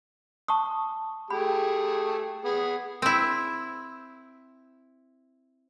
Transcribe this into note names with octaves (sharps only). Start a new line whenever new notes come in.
A5 C#6 D#6
A3 G4 G#4 B5
B3 G#4
C4 E4